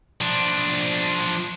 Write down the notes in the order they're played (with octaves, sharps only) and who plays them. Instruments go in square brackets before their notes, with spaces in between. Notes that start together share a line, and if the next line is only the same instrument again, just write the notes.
[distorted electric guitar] F3 D4